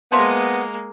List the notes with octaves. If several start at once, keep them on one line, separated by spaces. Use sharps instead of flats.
F3 G#3 A#3 B3 C5 E5